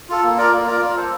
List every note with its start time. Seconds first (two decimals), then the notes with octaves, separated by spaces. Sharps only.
0.09 F4 A4
0.23 A#3
0.37 F4 A#4 D5
0.52 A#3
0.66 F4 A#4 D5
0.81 F4
0.96 A4 C5